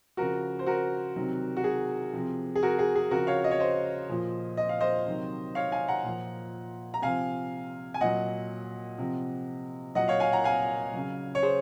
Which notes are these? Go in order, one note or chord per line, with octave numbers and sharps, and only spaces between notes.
C#3 F3 F#4 A#4
C5
F#4 A#4
C3 D#3 F#3
F#4
G#4
C3 F3
G#4
F#4 A#4
G#4
G#4
C#3 F3 F#4 A#4
C#5 F5
D#5
C#5
C5 D#5
A#2 F3
D#5
F5
C5 D#5
C3 D#3 F#3
C#5 F5
F5 G#5
F#5 A#5
A#2 F3
A#5
C3 F3 F5 G#5
G#5
A#2 F#3 D#5 F#5
C3 F3
A#2 F#3 D#5 F#5
C#5 F5
F5 G#5
F#5 A#5
F5 G#5
C#3 F#3
C#5
G#4 C5